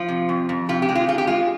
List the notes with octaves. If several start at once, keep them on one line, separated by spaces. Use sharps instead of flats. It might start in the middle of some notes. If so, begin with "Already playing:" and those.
Already playing: F3 F4
C3
F2
F2
C3 F4
G4
G#3
F4
C3 F4
G4
G#3 F4